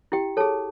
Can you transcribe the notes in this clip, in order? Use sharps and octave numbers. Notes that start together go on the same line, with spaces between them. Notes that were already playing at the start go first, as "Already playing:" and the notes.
E4 G4 G5
G#4 A4 C#5 A5